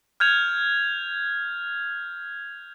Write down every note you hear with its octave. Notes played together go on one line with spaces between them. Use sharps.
F6 G6 G#6 F7